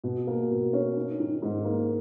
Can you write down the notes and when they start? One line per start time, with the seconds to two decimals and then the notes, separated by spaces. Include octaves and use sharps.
0.04 B2
0.27 A#3
0.51 B2
0.73 C#4
0.97 D#4
1.20 D#3
1.42 G#2
1.65 A#3